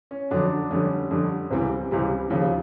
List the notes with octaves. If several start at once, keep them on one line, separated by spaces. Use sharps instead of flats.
C#4
F2 D3 F#3 D4
F2 D3 G3 C#4
F2 D3 G3
C#2 C3 E3 G3 C4
C#2 C3 E3 G3
D#2 C#3 F3